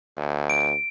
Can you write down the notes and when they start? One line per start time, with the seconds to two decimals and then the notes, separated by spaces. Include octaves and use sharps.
0.17 D2
0.50 D7